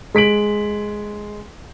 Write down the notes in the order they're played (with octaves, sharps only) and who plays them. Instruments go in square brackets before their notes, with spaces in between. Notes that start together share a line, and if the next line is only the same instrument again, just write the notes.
[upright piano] G#3 B6 D7 F#7